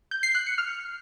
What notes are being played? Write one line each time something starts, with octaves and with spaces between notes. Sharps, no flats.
G6
C7
F#6
C#7
F6